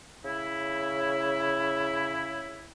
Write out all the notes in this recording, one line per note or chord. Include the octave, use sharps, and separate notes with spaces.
C#3 E4